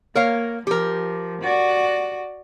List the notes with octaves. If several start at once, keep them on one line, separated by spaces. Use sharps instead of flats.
A#3 A#4 C#5 F5
F3 G4 A#4
F#4 D5